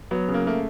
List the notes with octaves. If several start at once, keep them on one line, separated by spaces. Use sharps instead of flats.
F#3 B3
C#3
A#3
A3 A#3